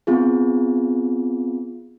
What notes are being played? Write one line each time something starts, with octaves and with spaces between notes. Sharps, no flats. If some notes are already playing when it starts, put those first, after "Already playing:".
B3 C4 F4 G#4